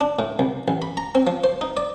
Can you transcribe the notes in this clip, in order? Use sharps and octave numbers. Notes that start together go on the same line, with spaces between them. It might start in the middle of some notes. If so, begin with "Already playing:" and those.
D4
A2
C2
A1
B5
A#5
C4
F3
C5
D#4
D5